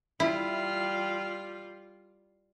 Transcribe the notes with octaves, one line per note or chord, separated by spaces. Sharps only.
G3 E4 F4